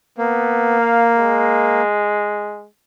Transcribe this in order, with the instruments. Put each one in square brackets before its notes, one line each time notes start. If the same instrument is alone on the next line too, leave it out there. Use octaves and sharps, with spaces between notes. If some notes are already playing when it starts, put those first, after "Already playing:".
[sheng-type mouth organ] A#3 [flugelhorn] B3
[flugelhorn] F5
G#3